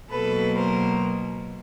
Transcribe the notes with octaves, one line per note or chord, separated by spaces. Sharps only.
B2 F#3 A#3 A4 B4
A#4 C5